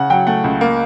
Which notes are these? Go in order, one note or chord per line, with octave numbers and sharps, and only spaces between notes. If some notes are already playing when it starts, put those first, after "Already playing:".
Already playing: C#3 F#5
F#3 G5
A3 F#5
C#2
A#3